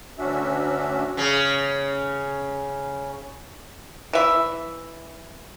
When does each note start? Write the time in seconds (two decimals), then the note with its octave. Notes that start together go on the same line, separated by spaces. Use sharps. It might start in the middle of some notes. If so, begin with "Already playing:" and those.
0.19 D2 C#4 D4 F#4 E5
1.17 C#3 C#4
4.13 E3 E5